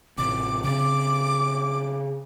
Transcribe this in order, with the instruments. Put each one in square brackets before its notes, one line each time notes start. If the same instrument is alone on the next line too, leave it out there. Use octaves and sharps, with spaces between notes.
[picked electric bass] A1 C3 [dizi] D6
[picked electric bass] C#3 C4 [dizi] D6